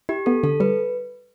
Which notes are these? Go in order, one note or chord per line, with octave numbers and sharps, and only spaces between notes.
E4 G4
B3 A4
D3 A4
G3 B4